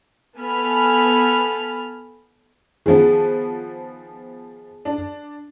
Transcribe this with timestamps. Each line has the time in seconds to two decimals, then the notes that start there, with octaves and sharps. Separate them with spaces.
0.37 B3 A4 G#5 A5 B5 F6
2.86 D#3 F3 B3 G#4
4.85 D4